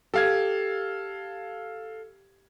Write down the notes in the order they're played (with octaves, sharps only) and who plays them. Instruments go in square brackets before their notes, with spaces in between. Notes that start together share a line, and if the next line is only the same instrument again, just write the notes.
[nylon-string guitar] G4 [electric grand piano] A4 F5 G#6